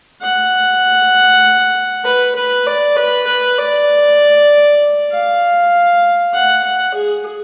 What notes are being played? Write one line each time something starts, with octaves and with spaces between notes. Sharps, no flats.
F#5
B4
B4
D5
B4
B4
D5
F5
F#5
F#5
G#4